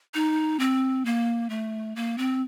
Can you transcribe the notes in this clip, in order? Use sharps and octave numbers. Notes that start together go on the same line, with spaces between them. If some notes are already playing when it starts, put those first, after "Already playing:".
D#4
C4
A#3
A3
A#3
C4